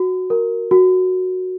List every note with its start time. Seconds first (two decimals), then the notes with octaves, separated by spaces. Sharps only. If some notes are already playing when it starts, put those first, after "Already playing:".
Already playing: F#4
0.30 A#4
0.71 F#4